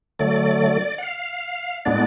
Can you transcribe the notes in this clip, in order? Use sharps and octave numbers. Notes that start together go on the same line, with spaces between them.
D3 F#3 A3 D5
F#5
F5
A2 G#3 B3 D4 D5